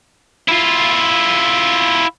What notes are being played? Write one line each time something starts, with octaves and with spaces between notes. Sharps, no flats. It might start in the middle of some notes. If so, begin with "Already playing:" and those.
E4 F4